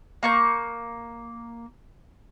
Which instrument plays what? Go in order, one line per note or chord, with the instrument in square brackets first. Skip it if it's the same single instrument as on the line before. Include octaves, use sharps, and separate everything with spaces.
[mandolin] A#3 C#6 G6